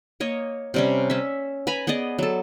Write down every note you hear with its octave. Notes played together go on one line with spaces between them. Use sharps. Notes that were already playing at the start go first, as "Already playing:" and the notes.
A#3 C#5 D#5
C3 G3 C#4
C#4 E5
B4 G#5 A#5 B5
B3 G#4 D5 D#5
F#3 A4